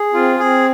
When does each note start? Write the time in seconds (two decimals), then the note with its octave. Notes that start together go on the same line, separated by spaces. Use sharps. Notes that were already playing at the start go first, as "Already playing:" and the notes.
Already playing: G#4
0.14 C4 F4
0.39 C4 G#4